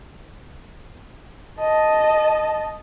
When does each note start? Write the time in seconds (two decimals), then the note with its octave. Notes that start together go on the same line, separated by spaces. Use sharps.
1.59 D#5 A5